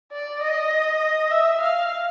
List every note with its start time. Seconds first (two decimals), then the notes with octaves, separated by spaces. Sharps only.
0.12 D5
0.42 D#5
1.31 E5
1.61 F5